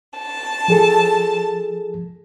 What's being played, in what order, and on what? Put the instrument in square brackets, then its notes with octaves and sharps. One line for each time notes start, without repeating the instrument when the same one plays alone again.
[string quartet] A5
[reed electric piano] F3 G#4 A4